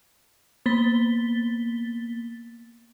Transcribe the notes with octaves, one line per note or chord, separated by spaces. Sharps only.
A#3 B3 A6 B6 G7